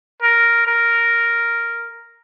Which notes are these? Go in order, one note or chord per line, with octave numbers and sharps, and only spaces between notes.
A#4
A#4